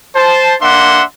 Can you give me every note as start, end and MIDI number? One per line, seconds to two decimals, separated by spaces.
0.16 0.55 72
0.16 0.55 81
0.62 1.03 58
0.62 1.03 62
0.62 1.03 76
0.62 1.03 78
0.62 1.03 84